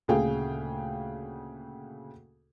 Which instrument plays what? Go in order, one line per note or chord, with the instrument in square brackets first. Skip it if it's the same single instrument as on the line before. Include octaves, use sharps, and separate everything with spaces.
[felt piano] D2 A#2 C#3 G#4 F5 G5